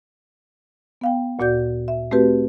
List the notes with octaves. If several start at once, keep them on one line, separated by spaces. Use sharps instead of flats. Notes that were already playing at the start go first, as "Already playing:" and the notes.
B3 F5 G5
D2 A#2 F#4 D5 G6
E5
A3 C4 F#4 G4 B4